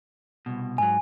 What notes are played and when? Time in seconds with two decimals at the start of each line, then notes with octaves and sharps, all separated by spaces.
0.46 C2 F#2 B2
0.78 G#2 F#3 G#5